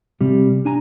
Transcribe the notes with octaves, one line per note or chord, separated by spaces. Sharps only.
C3 G3
D4 G#5 A#5